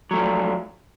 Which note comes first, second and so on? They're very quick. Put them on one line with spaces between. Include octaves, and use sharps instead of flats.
F#3 A3 F3